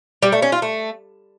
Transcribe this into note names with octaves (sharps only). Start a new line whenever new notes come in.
G3
A3
C#4
F4
A3